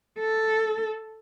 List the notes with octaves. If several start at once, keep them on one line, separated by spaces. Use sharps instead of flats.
A4